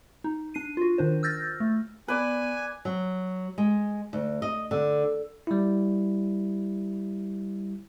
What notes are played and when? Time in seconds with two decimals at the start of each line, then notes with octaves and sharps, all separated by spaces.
0.24 D#4
0.54 D4 C7 D#7
0.77 F4 F#4
0.98 D#3 D4 C5
1.23 E6 F6 G6 A6 A#6
1.60 A3
2.08 B3 B4 D5 G#5
2.85 F#3
3.58 G#3
4.13 D2
4.42 D#5
4.71 D3
5.47 G3 E4